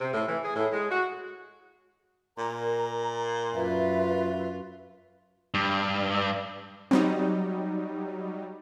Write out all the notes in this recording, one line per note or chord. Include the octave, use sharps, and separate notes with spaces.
C3
A2
E3
G#4
A2
G#3
F#4
A#2 A#4 A#5
F#2 F4 B4 E5
G2
F#3 G3 C4 D#4